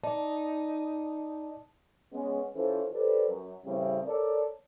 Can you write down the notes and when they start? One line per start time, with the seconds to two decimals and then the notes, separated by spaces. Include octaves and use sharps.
0.04 D#4 D5 A5
2.13 G#3 B3 C#4
2.56 E3 C#4 F4 A4 C5
2.93 G4 A4 B4 C5 D5
3.29 F#2
3.65 A2 C#3 E3 G3 C4 E4
4.06 A4 A#4 C#5 D5